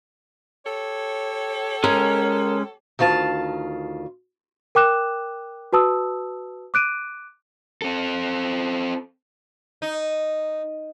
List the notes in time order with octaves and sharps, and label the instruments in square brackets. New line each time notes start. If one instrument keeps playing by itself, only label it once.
[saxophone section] G4 A4 C#5
[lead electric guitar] G#3 C#4 [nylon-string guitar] A#4
[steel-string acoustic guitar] D2 D#3 F4 D5 A5
[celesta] A#4 G5 D6 F#6 E7
F#4 B4 A5 D#6 E6
D6 F#6 D7 D#7
[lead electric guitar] C4 A4
[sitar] D#4